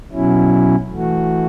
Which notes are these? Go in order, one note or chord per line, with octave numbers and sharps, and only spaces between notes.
B2 F#3 C#4 E4
E3 A3 F#4